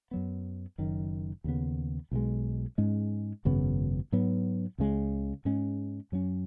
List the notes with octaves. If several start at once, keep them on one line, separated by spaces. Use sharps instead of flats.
F#2 F#3 B3
F#1 F#2 D#3
D#2 C#3 B3
B1 B2 G#3
G#2 G#3 C#4
G#1 F#2 C#3 B3
G#2 F#3 B3
C#2 C#3 G#3
G#2 G#3 C#4
F#2 F#3 C#4